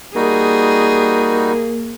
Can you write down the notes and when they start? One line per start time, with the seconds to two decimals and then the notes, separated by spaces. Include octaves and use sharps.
0.15 G3 A#3 D#4 F#4 G#4